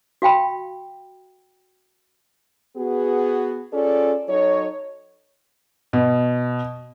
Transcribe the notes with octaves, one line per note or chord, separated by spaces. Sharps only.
F#4 F5 G5 B5
B3 F#4 G#4
C#4 F4 G#4 A4 D5
F#3 D#4 A4 C#5
B2